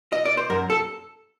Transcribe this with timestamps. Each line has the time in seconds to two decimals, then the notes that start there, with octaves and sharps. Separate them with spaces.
0.12 D#5
0.25 D5
0.37 C5
0.50 F#2 A#4
0.70 A4